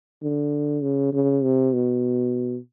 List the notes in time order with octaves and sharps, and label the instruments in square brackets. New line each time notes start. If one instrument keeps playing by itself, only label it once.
[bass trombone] D3
C#3
C#3
C3
B2